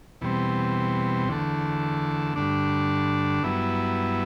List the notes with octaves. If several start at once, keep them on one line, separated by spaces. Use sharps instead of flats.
E2 B2 G3 C4
E2 D3 A3
G2 D3 A3 D4
G2 F#3 B3 E4